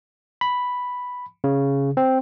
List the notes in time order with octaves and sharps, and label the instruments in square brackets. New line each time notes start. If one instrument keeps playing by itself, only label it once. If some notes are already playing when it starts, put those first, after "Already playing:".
[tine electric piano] B5
C#3
C4